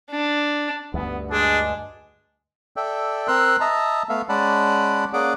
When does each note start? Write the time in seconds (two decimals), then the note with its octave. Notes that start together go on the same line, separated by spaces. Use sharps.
0.11 D4
0.94 D2 G2 B3
1.31 G#3 D4 F#4 G#4
2.76 A4 D5 E5 G5
3.28 C4 A#4 C6 E6 F#6
3.60 D#5 E5 A5 A#5
4.09 A3 B3 E5 F5
4.29 G#3 C#4 D5 F#5 A5 B5
5.13 A#3 C#4 G#4 D5 F#5 D6